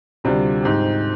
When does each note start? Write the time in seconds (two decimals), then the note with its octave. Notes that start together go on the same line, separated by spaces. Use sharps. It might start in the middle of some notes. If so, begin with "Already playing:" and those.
0.24 D2 C3 G3 D4 F4
0.63 G#2 F3 C4 G4